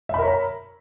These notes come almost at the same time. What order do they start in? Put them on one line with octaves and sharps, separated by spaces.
E5 B5 A#4 C#5 A#5